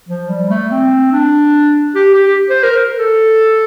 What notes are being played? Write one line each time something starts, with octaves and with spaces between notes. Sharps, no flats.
F3
G3
A3
C4
D4
G4
G4
C5
A#4
A4